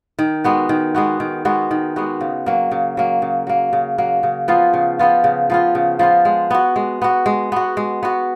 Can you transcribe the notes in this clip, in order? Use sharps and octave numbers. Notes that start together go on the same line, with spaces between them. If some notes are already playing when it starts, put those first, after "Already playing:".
D#3
G#3 B3 F#4
D#3
G#3 B3 F#4
D#3
G#3 B3 F#4
D#3
G#3 B3 F#4
C#3
F#3 A#3
C#3
F#3 A#3
C#3
F#3 A#3
C#3
F#3 A#3
C#3
F3 B3 F4
C#3
F3 B3 F4
C#3
F3 B3 F4
C#3
F3 B3 F4
G#3
B3 F#4
G#3
B3 F#4
G#3
B3 F#4
G#3
B3 F#4